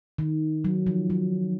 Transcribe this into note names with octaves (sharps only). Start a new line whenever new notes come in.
D#3
F#3
F3
F#3